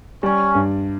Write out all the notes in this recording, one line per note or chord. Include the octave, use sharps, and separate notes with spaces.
G3 C#4
G2